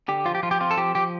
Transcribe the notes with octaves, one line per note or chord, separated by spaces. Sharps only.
D3 G4
F3 F4
G4
F3 F4
G4
C4 F4
A4
F3 G4
F3 G4